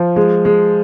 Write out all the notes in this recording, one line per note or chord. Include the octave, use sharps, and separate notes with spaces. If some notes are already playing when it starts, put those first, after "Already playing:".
Already playing: F3
G#3
G#3